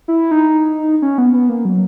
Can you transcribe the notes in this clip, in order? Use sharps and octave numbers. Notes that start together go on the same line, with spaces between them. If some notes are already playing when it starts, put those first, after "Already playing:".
E4
D#4
C#4
B3
B3
A#3
F#3